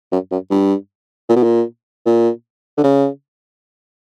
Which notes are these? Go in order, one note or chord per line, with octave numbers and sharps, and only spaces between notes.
F#2
F#2
G2
A#2
B2
A#2
A#2
D3
C#3